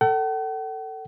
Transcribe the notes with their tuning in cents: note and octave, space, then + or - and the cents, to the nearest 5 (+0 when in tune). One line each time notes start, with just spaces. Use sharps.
A4 +20 F#5 +45